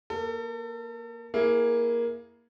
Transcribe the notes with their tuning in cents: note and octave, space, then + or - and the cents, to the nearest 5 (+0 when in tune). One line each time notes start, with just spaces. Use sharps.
A#3 +10 A4 +35
A#3 +10 E4 +0 G#4 +0